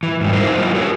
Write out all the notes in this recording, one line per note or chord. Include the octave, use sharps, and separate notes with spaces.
E3
G#2 D#3 F#3 G3
D#4 E4 F#4 G4 A#4 C5
F#3 E4 F4 G#4 A#4
F#4 G4 A#4 C#5